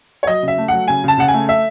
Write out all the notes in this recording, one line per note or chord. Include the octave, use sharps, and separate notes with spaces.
C#5
F#3 D#5
C#3
E5
A3
F#3 F#5
C#3 G#5
C#3 A5
C#3 F#5
G#5
A3
E5